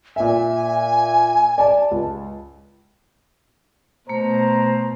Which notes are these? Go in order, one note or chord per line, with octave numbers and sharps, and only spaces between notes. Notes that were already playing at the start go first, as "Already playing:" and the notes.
A#2 E5 G#5
D5 A5
C#2
B2 A3 C5 A#5